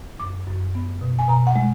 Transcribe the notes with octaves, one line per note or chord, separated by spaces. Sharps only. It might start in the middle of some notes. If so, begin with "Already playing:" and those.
F#2 D6
F#2
B3
B2
G#5
B2 A#5
F#5
G#3